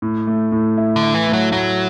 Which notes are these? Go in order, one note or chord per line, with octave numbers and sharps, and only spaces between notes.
A2
A3
A2
E4
D3
E4
E3
A3
F#3
A2 F#3